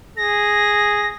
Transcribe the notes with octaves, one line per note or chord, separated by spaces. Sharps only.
G#4 A#6